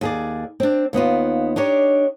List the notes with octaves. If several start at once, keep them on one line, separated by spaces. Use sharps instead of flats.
D#2 G#4 D5
C4 D4
D#2 B3 D#4 F4
D4 D#4 G4 C#5